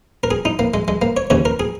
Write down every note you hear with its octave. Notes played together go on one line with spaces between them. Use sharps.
A#4
G#4
D#4
A#3
G#3
G#3
A#3
C#5
D#2 C#3 C#5
A#4
G#4